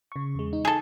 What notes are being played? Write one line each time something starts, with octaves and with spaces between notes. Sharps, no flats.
C#3 C#6
E2 G#3
D#4
G#4 A4